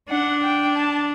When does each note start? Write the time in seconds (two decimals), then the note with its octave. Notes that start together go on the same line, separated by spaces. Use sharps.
0.09 D4 F#5
0.42 G5
0.75 A5